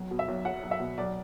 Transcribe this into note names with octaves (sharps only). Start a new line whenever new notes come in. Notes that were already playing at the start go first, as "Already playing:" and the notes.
Already playing: B1 F#3
B2
E5
B1
F#3 F#5
B1
E5
B2
B1 D5